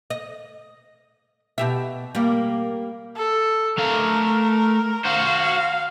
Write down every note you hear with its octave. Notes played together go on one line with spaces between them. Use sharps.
D#5
B2 G4 E5
G3 A#3
A4
A3 A#4 F5
F#4 C5 F5